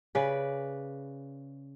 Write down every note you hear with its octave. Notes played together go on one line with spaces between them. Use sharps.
C#3 B4 D5